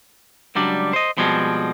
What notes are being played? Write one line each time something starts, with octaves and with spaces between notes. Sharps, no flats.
C#2 F#3 G3 D4
C5 D#5
B2 F3 G3 G#3 C4